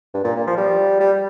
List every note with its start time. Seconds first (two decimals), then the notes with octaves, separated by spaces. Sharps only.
0.14 G2
0.24 A#2
0.36 A#2
0.47 F3
0.57 G3
1.00 G3